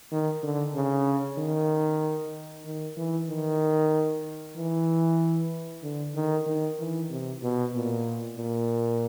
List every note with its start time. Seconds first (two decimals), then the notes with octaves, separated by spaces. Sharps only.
0.11 D#3
0.43 D3
0.74 C#3
1.38 D#3
2.65 D#3
2.97 E3
3.29 D#3
4.56 E3
5.83 D3
6.15 D#3
6.46 D#3
6.79 E3
7.10 C3
7.43 B2
7.74 A#2
8.37 A#2